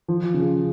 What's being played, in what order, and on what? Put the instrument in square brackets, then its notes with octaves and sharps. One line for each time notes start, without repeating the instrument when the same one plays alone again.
[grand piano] F3
C#3